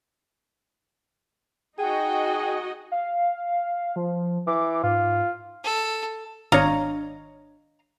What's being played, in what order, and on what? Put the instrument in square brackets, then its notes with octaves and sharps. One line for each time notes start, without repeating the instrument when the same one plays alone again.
[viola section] D#4 F#4 D#5 [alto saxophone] G#4 [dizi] G5
[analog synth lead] F5
F3
[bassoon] E3 [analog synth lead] D6
[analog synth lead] G#2 [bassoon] F4
[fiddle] A4
[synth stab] G#1 D4 C#5 [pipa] D#5 F5 A#5